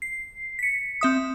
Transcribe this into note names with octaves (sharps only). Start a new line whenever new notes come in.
C7
B6 C#7
C4 E5 D#6